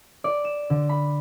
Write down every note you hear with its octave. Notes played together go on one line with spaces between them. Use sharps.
D5
E7
D3
B5